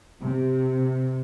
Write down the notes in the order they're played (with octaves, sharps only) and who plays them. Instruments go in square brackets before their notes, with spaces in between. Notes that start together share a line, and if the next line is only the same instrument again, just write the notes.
[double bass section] C3